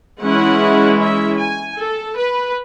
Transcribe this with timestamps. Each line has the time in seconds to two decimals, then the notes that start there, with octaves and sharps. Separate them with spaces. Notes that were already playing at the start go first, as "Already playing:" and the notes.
0.21 E3 G#3 C#4 E4 F#5
1.00 E5
1.38 G#5
1.77 A4
2.16 B4